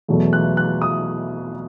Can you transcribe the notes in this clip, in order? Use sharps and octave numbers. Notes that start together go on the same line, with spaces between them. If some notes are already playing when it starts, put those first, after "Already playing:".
E2 B2 F#3 A3
F#6
F#6
D#6